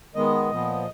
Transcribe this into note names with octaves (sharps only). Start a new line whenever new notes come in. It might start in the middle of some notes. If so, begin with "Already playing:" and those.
D#3 G#3 B3 D#5
A#2 F3 B3